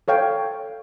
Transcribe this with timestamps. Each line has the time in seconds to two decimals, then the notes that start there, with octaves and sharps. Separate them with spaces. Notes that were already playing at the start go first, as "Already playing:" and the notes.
0.08 A4 C#5 F5 G5